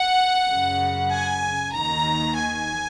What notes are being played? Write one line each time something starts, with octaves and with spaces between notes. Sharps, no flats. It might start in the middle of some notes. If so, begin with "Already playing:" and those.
Already playing: F#5
F#2 C#3
G#5
D#2 D#3 A#5
G#5